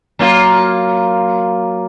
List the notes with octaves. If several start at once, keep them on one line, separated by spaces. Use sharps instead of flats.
F#3 A#3 F4